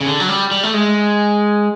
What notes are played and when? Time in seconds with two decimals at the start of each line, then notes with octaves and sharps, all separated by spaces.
0.01 C#3
0.06 D3
0.20 F#3
0.29 G3
0.51 G3
0.63 A3
0.74 G#3